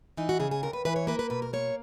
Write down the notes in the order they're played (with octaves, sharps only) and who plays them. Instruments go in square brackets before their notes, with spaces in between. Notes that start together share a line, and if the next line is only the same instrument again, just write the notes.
[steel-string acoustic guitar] E3 D#4
F#4
C#3 G#4
G#4
D#2 A#4
B4
E3 B4
C#5
A#3 B4
B4
B2 B4
A#4
A#3 C#5